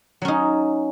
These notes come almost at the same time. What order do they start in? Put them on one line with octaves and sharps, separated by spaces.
F#3 C#4 D#4